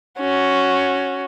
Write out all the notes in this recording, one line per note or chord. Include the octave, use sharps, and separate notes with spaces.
C#4 F#4